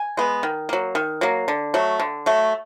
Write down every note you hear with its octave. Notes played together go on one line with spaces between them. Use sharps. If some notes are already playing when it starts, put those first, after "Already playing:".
Already playing: G#5
G#3 B3
D#3
F#3 A#3
D#3
F#3 A#3
D3
F#3 A3
D3
F#3 A3